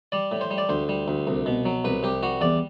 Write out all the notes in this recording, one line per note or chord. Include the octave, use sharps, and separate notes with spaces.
G3 D5
A2
C5
G3
D5
D2 C5
G3
D2
C2
B2
F#3
C2 B4
C2 G4
G3 F#4
E2 D5